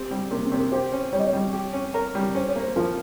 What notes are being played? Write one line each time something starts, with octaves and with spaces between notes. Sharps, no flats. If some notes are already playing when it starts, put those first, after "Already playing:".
Already playing: C4 G4
G3
C3 A#3
C4
C3
A#4
G4 C5
C#4
G3 C#5
D#5
C#5
G3
G4
C#4
A#4
G3
C#4 C5
C#5
A#3
C5
F3 A#4